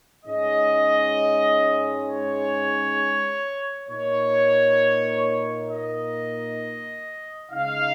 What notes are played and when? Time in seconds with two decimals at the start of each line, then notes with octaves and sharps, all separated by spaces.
0.25 G#2 G#3 C#4 D#5
2.06 C#5
3.88 A#2 A#3 D#4 C#5
5.70 D#5
7.51 C#3 G#3 D#4 F5